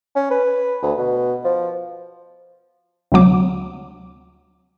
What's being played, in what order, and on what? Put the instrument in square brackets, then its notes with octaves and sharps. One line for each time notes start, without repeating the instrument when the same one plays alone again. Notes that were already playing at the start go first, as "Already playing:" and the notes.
[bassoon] C#4
B4
D2
B2
F3
[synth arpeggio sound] D2 C3 F#3 D6